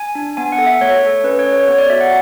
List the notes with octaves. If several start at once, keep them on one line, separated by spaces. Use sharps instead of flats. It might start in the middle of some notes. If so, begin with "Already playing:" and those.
Already playing: G#5
D4
B3 G#5
F#5
A4
E5
A3 C#5
A4
C#4 B4
C#5
A4
C#5
B3 C#5
D5
F#4 E5
F#5